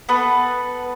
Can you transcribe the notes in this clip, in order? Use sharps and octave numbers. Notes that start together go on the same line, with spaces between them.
B3 A4 B4